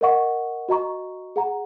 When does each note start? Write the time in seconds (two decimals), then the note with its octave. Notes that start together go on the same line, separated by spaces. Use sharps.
0.01 A#4 D#5 F#5 C#6
0.69 F#4 D#5 A#5 C#6
1.36 G#4 F#5 A#5